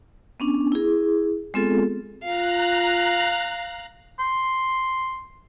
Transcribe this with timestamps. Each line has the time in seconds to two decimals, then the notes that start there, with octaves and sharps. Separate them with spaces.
0.40 B3 C#4 D4
0.72 E4 G#4
1.54 G#3 B3 C4 F4 G#4 A4
2.24 F4 F5 A#5 F#6
4.19 C6